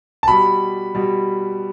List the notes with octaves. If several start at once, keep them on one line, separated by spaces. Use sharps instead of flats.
A5
B2 G3 B5
B2 G3